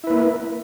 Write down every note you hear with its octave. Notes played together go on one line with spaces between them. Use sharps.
A#3 E4 B4